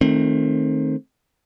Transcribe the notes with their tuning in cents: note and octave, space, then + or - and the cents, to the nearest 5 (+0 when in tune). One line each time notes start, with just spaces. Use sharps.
D#3 +0 A3 +0 C4 +25